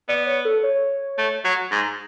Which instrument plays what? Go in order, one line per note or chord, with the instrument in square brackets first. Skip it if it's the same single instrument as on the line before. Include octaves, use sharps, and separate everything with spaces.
[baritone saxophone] B3 [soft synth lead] D5
[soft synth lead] C#5
A4
C#5
[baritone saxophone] A3
F#3
G#2